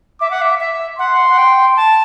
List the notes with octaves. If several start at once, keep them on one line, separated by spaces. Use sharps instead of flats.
E5 D6
F#5
E5
E5
F#5 C6
F#5
G5
A5